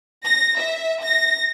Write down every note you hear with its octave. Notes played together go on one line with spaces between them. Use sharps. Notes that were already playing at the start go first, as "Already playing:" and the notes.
A#6
E5
A#6